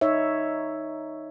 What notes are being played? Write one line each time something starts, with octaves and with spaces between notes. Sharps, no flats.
D#4 C#5 E5